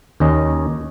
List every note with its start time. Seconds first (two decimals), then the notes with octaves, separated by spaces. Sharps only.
0.20 D#2 C#4 D#5